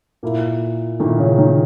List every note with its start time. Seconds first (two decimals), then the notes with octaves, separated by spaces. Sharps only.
0.23 A#2 A#3 E4
1.00 A#2 D#3 A#3 E4
1.19 C#3
1.38 D#3